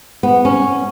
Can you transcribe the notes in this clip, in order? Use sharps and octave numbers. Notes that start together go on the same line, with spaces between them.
B3
C#4